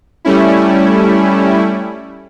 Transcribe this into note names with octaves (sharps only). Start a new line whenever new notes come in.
G3 A3 C#4 E4